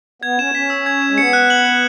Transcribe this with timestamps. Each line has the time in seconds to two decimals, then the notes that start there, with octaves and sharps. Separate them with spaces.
0.22 B3 G#6
0.38 C#4 E7
0.54 C#4 B6
0.70 E6
0.86 G#6
1.02 E7
1.11 G#3
1.18 B3 C#7
1.33 F#6
1.50 F#7
1.65 F#6